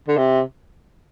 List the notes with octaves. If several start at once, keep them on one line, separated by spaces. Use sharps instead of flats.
D3
C3